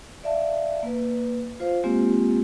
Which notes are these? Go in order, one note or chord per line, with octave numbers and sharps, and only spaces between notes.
D5 E5 F5 A5
A#3 B4
F4 C5 F5
G#3 A#3 C4 F4 G4